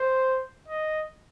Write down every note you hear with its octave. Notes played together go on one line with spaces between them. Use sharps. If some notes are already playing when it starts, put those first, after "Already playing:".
Already playing: C5
D#5